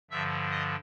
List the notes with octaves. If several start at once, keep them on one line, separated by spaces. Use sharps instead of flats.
G2 D3 F3 E5 E6
D#5 D#6